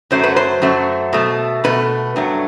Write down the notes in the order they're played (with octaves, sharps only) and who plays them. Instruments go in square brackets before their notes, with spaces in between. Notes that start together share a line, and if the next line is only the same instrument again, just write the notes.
[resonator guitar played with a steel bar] F#2 F#3 A3 C5
B4
C5
F#2 F#3 A3
B2 A3
B2 A3 B4
G2 F#3 A3